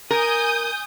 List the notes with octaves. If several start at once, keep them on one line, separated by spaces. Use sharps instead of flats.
A#4 G#5 D#6 G6